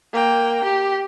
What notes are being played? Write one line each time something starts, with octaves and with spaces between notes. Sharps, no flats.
A#3 G5
G4